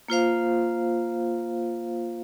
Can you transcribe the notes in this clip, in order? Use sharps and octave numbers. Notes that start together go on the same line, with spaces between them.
A#3 F4 C5 F5